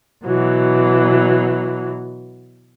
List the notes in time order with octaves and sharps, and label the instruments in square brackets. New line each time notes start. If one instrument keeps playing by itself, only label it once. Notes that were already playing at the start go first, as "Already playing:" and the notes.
[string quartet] B2 E3 F#3